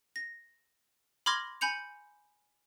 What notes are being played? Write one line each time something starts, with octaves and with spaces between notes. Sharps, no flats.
A#6
B5 C6 D6 F6 G#6 A#6
G#5 B5 G6 C#7 F7